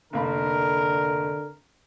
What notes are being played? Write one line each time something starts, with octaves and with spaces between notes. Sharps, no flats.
F1 D3 A#3 A#4 B5